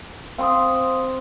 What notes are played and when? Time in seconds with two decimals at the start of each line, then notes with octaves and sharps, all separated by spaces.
0.38 C4 F5 C6 D#6